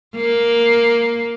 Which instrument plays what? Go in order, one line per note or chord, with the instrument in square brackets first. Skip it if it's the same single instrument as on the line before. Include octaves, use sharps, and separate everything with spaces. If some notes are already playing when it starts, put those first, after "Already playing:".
[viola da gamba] A#3